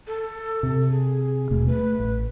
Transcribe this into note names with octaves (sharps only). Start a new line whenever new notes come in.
A4
C3
G#4
D#1 B2 A3
A3 B4
A1